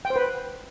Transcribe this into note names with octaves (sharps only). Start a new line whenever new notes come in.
G5
C5
B4